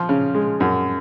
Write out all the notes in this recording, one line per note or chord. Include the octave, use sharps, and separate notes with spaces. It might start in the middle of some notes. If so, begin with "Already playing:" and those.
Already playing: F3
C#3
G#3
F#2